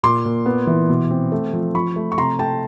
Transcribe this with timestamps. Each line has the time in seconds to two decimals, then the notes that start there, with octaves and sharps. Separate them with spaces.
0.03 A#2 C6 D6
0.25 A#2
0.46 B3
0.67 E3
0.89 B2
1.11 C4
1.32 A3
1.53 F3
1.75 F3 B5 C#6
1.96 A3
2.12 C#6
2.17 C3 A#5 C6
2.39 A3 G5 A5